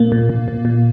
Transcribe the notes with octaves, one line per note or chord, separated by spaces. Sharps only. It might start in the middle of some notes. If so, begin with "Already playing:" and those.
Already playing: A#2 A#3
A#2
A#2
A#2
A#2